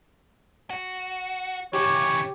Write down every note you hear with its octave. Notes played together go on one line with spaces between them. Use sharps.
F#4
C#3 E3 G4 C#5